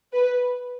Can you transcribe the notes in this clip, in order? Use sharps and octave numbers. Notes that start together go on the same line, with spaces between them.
B4